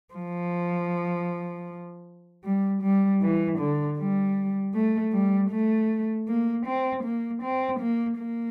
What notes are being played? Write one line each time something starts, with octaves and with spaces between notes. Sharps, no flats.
F3
G3
G3
E3
D3
G3
A3
G3
A3
A#3
C4
A#3
C4
A#3
A#3